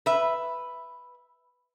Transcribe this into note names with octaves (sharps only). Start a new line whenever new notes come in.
B4 E5